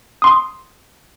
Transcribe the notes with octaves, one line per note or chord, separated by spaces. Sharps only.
C6 D#6